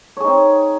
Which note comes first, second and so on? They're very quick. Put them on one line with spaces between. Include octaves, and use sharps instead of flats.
C#5 G#4 D#4 C4